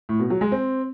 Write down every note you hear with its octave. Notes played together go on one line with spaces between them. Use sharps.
A2
B2
F#3
G#3
C4